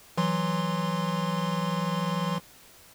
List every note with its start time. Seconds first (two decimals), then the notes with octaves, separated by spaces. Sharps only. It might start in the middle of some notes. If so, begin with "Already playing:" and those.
0.18 E3 F#3 C6